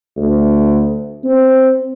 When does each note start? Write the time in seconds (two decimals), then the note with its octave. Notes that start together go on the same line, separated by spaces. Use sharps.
0.17 D2
1.24 C4